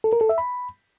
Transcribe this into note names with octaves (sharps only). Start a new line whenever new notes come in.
A4
A#4
A4
E5
B5